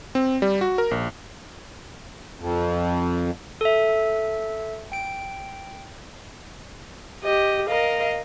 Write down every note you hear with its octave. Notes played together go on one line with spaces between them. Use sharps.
C4
G3
F#4
A#4
A#1
F2
A4 E5
G5 D7
G4 D#5
A#4 D#5 F5